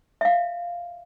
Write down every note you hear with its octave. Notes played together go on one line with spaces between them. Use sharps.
E5 F5